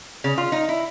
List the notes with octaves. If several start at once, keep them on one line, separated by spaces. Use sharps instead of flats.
C#3
F4
D#4
E4